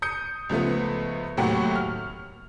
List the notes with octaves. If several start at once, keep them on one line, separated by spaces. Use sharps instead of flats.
D#6 G6 C#7
C#2 F3 A3 B3
D#2 A2 C3 F#3 G4 F#5
F6